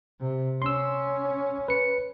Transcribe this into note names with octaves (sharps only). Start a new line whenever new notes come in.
C3
C#4 C6 E6
B4 C#7